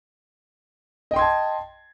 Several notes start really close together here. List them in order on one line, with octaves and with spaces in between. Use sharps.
D#5 G5 C6 G#6 A5